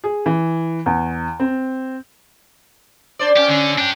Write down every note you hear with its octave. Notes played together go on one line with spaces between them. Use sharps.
G#4
E3
E2
C4
D4 C5 D5
C#4 G4
D3
D4 G4